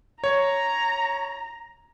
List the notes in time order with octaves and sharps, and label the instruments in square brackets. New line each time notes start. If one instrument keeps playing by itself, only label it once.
[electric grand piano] C#5 [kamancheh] A#5